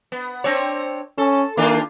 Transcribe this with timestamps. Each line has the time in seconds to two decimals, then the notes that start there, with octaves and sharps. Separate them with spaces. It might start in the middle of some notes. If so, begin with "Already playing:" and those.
0.12 B3
0.44 C4 D4 C#5
1.18 C#4 A4
1.57 D#3 A#3 D4 F4